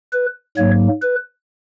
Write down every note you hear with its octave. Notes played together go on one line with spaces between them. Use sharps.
B4
G#2 F#3 A#3 C#5
B4